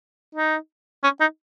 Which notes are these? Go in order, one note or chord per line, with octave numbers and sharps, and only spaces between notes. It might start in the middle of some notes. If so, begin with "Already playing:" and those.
D#4
C#4
D#4